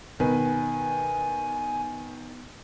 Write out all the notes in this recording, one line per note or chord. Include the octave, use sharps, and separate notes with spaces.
B2 D#3 B4 G#5